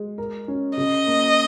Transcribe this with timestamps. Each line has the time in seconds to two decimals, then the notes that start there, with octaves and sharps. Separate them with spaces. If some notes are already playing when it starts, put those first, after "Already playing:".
Already playing: G#3
0.18 A#4
0.48 C#4
0.77 C#3 D#5
1.07 A#3